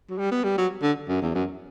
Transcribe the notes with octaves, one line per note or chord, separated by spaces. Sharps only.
F#3
G3
B3
G3
F#3
D3
F#2
E2
F#2